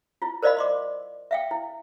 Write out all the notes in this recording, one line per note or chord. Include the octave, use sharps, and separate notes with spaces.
E4 F4
A#4 C5 D5 D#5 F5 B5
D#5 C6 D6
E5 F5 G5
E4